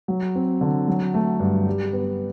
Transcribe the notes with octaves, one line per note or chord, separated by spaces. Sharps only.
F#3
C4
D3
F#3
A3
G2
G3
B3